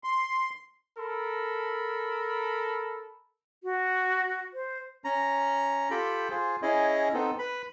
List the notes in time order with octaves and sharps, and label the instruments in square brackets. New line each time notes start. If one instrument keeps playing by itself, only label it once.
[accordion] C6
[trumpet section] A4 A#4 B5
[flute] F#4
C5
[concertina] C#4 A#5
F4 G4 A4 G5 B5
F4 G#4 C5
C#4 E4 G#4 D#5
B3 C4 D#4 A4
B4 B5